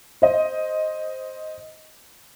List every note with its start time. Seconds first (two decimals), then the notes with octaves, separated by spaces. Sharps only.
0.22 C5 D#5